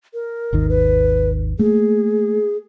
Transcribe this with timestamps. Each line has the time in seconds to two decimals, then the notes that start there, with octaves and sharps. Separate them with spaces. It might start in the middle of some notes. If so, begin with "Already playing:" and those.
0.14 A#4
0.53 G#1 D#2 D#3
0.69 B4
1.59 A3 A#3 G#4